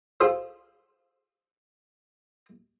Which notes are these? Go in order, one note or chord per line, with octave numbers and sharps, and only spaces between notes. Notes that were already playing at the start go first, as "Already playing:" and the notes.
F4 G#4 A4 C5